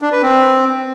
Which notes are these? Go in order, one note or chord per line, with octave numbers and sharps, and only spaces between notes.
D4
B4
C4